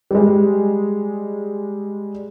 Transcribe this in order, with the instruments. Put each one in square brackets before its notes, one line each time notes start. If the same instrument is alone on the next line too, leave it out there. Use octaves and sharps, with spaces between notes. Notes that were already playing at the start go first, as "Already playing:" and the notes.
[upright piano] G3 G#3